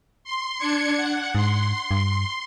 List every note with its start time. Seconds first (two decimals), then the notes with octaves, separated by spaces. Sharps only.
0.24 C6
0.58 D4 G#6 C#7
0.97 F#5
1.35 G#2 C6
1.91 G2